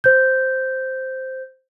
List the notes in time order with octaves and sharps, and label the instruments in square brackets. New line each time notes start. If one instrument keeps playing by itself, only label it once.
[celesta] C5 G6